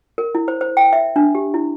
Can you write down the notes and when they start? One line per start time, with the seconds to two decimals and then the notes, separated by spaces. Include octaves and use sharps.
0.18 A#4
0.35 E4
0.48 C5
0.61 C5
0.77 G5
0.93 E5
1.16 D4
1.35 G4
1.54 E4